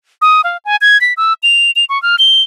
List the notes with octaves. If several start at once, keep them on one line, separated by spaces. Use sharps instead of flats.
D#6
F5
G#5
G#6
B6
E6
F7
F7
C#6
F6
G7